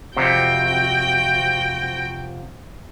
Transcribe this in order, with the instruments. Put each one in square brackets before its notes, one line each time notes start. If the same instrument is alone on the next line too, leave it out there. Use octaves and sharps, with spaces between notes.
[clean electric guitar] F2 C3 [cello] F#4 G5